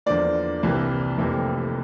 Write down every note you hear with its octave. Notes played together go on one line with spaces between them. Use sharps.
E2 D3 F3 A#3 D5
C2 C3 E3 A#3
F1 F2 C3 E3 A#3